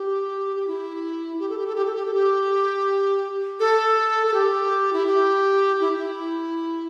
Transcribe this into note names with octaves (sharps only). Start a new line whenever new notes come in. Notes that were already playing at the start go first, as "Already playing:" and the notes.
Already playing: G4
G4
E4
G4
A4
G4
A4
G4
A4
G4
A4
G4
A4
A4
G4
E4
G4
E4
E4